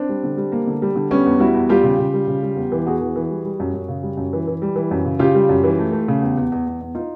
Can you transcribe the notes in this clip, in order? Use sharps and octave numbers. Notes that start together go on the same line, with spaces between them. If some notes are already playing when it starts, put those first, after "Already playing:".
Already playing: C4 D4
G3
D3
G3
A#3
D3
G3
D3
G3 B3 C#4
E2
G3 E4 F#4
E2
G3 F4 G4
C#3
C#3
G3
C#3
G3
E2
E3
E2 F#4 G#4
E3
E3
G3
G3
F#2
F#2
C#3
G3
F#2
E3
E3
G3
E3
F#2
C#3
C#3 F4 G4
G3
F#2
E3
A3
A3
C#3
E2
E2
E2
E2
E2
D#4 F4